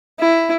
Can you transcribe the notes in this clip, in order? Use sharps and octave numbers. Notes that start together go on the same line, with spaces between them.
E4